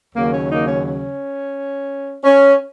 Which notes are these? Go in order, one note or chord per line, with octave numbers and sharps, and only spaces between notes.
D#2 C#3 F#3 A#3
C#4
A#3 D#4
C#4
C#4
C#4